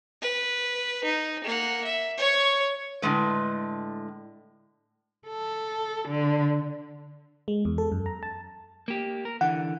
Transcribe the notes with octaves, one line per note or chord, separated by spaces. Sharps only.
B4
D#4
A#3 F#5
E5
C#5 C#6
A2 D3 G#3 B4
A4
D3
G#3
E2
A4
F#2
A#5
A5
A#3 G4
A#4
D3 E3 F#5